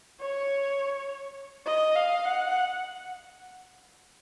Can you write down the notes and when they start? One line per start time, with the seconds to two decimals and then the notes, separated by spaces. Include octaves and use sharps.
0.21 C#5
1.66 D#5
1.96 F5
2.25 F#5